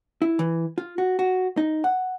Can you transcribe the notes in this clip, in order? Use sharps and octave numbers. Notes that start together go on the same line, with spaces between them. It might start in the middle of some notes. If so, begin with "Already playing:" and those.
E4
E3
F4
F#4
F#4
D#4
F#5